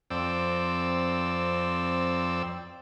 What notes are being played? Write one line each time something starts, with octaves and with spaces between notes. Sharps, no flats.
F2 C4 D5 E6